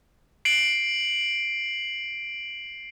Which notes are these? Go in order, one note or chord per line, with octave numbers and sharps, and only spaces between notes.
C7 D7 F#7